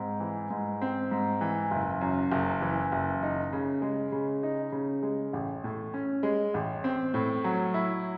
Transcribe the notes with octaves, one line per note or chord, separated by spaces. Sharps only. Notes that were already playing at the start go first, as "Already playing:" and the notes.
Already playing: G#2 C4
E3
G#2
C4
G#2
E3
F#1
F#2
F#1
E3
F#1
D#4
C#3
G#3
C#3
D#4
C#3
G#3
A1
A2
C#4
G#3
A1
C4
A2
F#3
E4